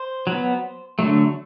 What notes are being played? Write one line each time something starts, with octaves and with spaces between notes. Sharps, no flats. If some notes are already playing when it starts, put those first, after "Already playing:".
Already playing: C5
F#3
B3
D3 F#3 A3